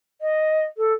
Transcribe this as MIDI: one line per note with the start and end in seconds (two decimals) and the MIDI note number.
0.21 0.63 75
0.77 0.93 69